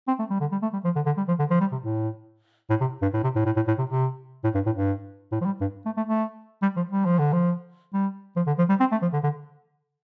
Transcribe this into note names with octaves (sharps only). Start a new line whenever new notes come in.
C4
A3
G3
D3
G3
A3
G3
F3
D3
D3
G3
F3
D3
F3
G3
C3
A2
A2
C3
G2
A2
C3
A2
A2
A2
A2
C3
C3
A2
G2
A2
G2
A2
F3
G3
G2
A3
A3
A3
G3
F3
G3
F3
D3
F3
G3
F3
D3
F3
G3
C4
A3
F3
D3
D3